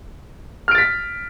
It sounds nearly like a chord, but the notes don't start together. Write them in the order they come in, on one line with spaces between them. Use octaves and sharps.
F6 D7 A6 B6